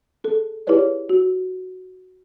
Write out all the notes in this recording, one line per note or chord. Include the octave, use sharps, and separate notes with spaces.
G#4 A4
E4 G4 G#4 B4 C#5 D5
F#4